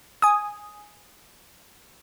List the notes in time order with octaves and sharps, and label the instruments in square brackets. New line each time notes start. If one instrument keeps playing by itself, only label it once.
[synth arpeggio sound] G#5 D#6